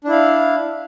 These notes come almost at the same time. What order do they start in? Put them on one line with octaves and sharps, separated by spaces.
D4 E4 F5